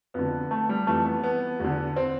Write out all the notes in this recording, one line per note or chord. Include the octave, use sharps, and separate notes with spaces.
F2 D3 B3
A3
G3
F2 E3 A3
B3
B3
E2 D3
C4